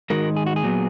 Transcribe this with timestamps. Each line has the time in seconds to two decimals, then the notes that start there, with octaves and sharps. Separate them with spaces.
0.10 G#2 D#3 G#3 D#4 F#4 A#4
0.36 G#4
0.46 F#4
0.56 G#4
0.63 A#2 F#3 B3